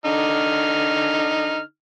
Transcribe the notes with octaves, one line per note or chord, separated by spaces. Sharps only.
D3 D#4 F6